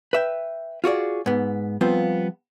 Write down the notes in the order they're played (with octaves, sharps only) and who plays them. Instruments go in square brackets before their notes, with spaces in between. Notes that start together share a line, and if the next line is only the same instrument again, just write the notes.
[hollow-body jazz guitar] B4 E5 G5
F4 F#4 G#4 D5
G#2 B3
F3 G3 B3 C4 F4